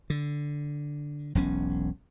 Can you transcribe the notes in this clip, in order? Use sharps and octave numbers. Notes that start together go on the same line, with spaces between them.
D3
E1 B1 C#4